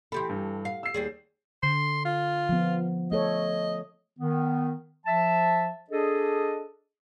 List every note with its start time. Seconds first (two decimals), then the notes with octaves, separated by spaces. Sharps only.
0.12 E3 G4 A4 B5 C6
0.29 G2
0.65 F5
0.83 E6 C7
0.94 D#2 G3 G#4
1.63 D3 C6
2.05 F4
2.49 F3 B3
3.12 A3 A4 C#5 D#5
4.19 D#3 B3
5.06 F3 E5 A5
5.90 D4 G#4 A4 D#5